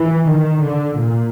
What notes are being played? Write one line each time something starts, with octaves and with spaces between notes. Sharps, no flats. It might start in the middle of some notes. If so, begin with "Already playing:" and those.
Already playing: E3
D#3
D3
A#2